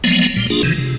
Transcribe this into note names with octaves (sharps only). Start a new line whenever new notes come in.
F3 F#3 G#3 A#3 B3
A#2 G3
A#3 D4 F4 G#4
C3 D#3 E3
C3